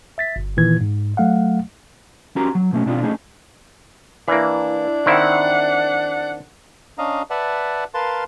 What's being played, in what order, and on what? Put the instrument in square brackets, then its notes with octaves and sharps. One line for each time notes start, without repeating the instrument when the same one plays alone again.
[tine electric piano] E5 A6 B6
G1
A#2 D#3 E3 G#6
G#2
F#3 A3 F5 F#5
[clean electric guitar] C#4 F#4 G4 A#4 A#5
F#3
B2 A3 C#4
B2 C4 D4 D#4 F4
A3 C#4 D#4 G#4
[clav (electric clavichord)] E3 A#3 [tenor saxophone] D4 [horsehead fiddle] E4
[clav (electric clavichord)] D#3 C4 E4 [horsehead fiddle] F#5
[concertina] C#4 D4 D#5 F5 A#5
B4 D5 E5 F#5 A5
A#4 B4 F5 A5 C6